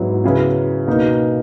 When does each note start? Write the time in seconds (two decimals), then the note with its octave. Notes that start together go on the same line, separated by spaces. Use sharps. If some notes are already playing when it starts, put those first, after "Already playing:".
Already playing: G#2 F#3 B3 E4
0.24 C#3 F#3 B3 E4
0.87 B2 A#3 D#4